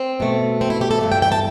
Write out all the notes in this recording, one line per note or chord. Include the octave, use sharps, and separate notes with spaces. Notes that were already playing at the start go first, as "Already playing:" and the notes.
Already playing: C4
B2 A3
C4
E4
G4
A4
G2 E3 A3
G5
G5
A5